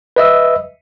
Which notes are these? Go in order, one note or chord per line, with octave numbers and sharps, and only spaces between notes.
B4 D#5 E5 E6